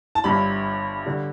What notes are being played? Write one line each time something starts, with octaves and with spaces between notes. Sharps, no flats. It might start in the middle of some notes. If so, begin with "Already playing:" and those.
A5
G1 G2 G3 B5
D3 G3